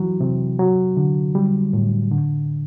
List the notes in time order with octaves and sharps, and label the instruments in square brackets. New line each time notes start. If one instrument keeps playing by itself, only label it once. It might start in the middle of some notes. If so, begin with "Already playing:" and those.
Already playing: [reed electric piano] E3 F#3
C3
F#3
D3
G3
A2
D3